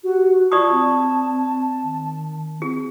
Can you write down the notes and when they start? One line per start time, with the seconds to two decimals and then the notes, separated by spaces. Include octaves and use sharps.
0.04 F#4 G4
0.52 F4 D5 A5 C#6 D#6
0.71 C4
1.83 D#3
2.62 C4 G#4